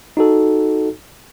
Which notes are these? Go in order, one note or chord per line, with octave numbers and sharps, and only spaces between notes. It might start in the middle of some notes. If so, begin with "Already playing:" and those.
D#4 F#4 A4